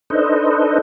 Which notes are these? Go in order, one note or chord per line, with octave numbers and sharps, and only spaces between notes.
D4 D#4 A4 B4 C5 D#5